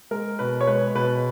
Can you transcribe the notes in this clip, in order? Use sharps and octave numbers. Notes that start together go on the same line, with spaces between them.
G#3 A#4
B2 B4
C#5
G#3 B4
B2 B4